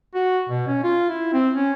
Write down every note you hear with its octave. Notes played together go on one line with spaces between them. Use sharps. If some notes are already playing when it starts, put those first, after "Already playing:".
F#4
B2
C#4
F4
E4
C4
C#4